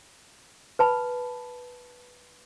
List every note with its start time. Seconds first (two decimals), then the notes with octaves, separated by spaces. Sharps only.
0.79 B4 A5 B5